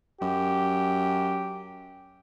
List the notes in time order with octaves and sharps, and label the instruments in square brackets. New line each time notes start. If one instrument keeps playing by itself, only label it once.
[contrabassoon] F#2 [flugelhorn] G4